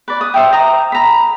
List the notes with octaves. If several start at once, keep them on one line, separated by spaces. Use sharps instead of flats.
B4 D5
D#6
C5 E5 G5
A#5 D#6
A#5 B5